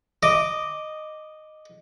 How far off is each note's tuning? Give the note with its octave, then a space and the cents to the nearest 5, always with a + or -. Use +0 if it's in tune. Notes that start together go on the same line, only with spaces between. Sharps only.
D#5 -10 D6 +0